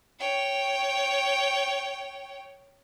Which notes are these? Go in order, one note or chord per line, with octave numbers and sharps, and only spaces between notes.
C#5 G5